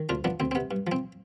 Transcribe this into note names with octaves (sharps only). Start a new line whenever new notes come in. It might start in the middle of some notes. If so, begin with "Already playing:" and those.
Already playing: D#3
D2 D4 F4
F3 B3 D4
D2 C4
C4
C3 B3
G2
F3 C4